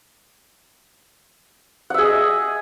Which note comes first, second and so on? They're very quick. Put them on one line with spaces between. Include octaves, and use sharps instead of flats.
F#5 E5 G#4 D#5